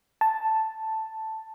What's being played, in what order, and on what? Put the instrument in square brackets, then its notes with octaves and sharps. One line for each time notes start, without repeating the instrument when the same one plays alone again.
[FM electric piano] A5